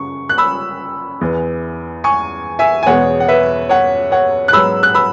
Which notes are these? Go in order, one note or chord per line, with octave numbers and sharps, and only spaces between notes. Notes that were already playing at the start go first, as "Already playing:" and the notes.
Already playing: F#2 C#3 C#6
F#6
B5 E6
E2 E3 B3
G#5 C#6
E5 G#5
G#5
E2 B2 G#3 B3 C#5 F#5
F#5
B4 E5
C#5 F#5
C#5 F#5
F#6
G#2 F#3 B3 B5 E6
F#6
B5 E6